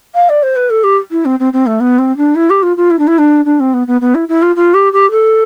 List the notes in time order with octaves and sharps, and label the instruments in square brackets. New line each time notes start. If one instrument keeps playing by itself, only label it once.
[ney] F5
D5
C5
B4
A4
G4
E4
C4
C4
C4
A3
B3
C4
D4
E4
G4
F4
F4
E4
D4
E4
D4
D4
C4
B3
B3
B3
E4
E4
F4
F4
G4
G4
A4